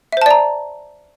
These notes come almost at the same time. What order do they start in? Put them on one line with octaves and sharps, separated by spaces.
E5 C5 A5 D5 A#5